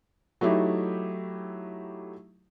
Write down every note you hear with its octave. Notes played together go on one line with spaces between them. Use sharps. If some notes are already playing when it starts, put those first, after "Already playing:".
F#3 A3 D#4 E4 G4